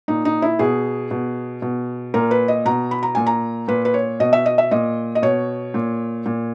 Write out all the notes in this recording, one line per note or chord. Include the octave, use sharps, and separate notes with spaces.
A#2 D#4
D#4
E4
B2 G#4
B2
B2
A#2 A#4
B4
D#5
B2 A#5
B5
A#5
A#2 G#5
A#5
A#2 B4
B4
C#5
B2 D#5
E5
D#5
E5
A#2 D#5
D#5
B2 C#5
A#2
A#2